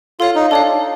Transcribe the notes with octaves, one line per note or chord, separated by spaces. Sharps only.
F4 A4 C#5 F5
D#4
D4 A4 C#5 F5